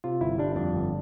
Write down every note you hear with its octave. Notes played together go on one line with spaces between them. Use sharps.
C3 F4
G1 E4
G3 D4
F2 D4
G1